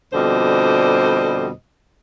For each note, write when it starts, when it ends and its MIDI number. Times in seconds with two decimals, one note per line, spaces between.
0.13 1.50 41
0.13 1.50 47
0.13 1.50 50
0.13 1.50 55
0.13 1.50 72
0.13 1.50 75